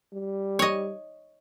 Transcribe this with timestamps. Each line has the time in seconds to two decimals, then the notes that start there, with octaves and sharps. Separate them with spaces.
0.13 G3
0.59 C#5 D#5